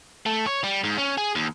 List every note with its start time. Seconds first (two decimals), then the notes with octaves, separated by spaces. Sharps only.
0.26 A3
0.47 C#5
0.64 G3
0.84 G#2
0.98 C#4
1.18 G#4
1.35 D#2